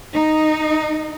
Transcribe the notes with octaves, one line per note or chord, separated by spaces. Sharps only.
D#4